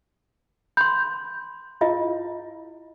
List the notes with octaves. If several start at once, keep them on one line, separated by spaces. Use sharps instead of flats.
B5 C6 G6
E4 F4 D#5